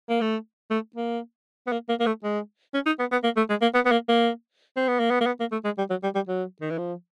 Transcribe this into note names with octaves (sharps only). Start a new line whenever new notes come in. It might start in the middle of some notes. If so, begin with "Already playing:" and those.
A#3
A3
A3
A#3
B3
A#3
A#3
A#3
A3
G#3
C#4
D#4
B3
B3
A#3
A3
G#3
A#3
B3
B3
A#3
A#3
C4
B3
A#3
B3
A#3
B3
A#3
A3
G#3
G3
F#3
G3
G3
F#3
D#3
E3
F3